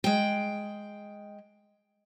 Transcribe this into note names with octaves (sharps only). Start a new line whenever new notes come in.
G#3 G5